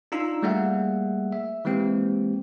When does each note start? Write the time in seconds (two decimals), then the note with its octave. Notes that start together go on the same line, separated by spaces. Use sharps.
0.12 D4 D#4 F4 A#5 E6
0.42 G3 A3 A#3 G#4 E5 F#5
1.33 E5
1.65 E3 G#3 A#3 C4 G4